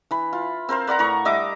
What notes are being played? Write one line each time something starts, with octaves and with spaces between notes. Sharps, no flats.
E3 B5
F4
C4 A#4 C5 F5
B4 D5 F#5 A#5
A2 A#5 C#6
G3 D#5 E5 D6